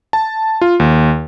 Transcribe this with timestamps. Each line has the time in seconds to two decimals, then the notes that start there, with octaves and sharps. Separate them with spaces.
0.13 A5
0.61 F4
0.80 D#2